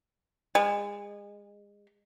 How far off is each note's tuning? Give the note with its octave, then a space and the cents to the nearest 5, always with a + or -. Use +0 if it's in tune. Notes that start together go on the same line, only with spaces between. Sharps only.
G#3 -30